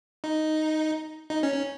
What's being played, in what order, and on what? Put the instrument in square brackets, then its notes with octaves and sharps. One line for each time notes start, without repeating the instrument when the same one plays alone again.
[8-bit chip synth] D#4
D#4
C#4
C#4